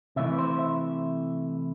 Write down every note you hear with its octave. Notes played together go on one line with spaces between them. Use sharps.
C3 E3 A3 E5
B4
C5
E5